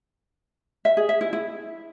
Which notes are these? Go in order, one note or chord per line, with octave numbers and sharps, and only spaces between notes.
E5
G#4
E5
E4
E4